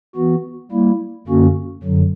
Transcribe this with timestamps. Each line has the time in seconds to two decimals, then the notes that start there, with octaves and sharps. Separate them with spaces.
0.16 E3 B3 F#4
0.71 G3 A#3 E4
1.28 F#2 D3 A#3 C#4 F#4
1.83 F#2 D3 F#3